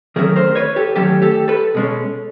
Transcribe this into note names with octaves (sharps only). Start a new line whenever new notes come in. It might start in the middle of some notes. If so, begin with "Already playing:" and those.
D#3 F#3 A3 C#4 G#4 A#4
A#4 C5
B4 C#5
G4 A4
D#3 F#3 A3 C#4 G4 A4
G4 A4
A4 B4
B2 G#3 C#4